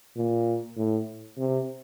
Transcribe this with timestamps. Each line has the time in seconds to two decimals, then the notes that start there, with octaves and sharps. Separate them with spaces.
0.16 A#2
0.77 A2
1.37 C3